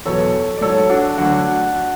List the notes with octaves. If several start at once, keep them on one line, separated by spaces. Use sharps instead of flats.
E2 B2 F#3 A4 C#5
D5
G#2 F#3 A4 C#5
D4 F#4
D2 D3 F#3 D4 F#4